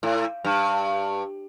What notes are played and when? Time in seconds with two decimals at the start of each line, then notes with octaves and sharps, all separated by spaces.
0.03 A2
0.45 G2